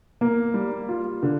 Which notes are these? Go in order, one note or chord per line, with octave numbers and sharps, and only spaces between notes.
A#3
G3
F4
D3